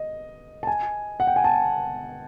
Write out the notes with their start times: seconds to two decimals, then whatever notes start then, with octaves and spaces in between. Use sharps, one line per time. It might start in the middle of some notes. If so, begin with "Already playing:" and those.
Already playing: D#5
0.63 A5
0.67 G#5
1.20 F#5
1.27 G5
1.36 G#5
1.44 A5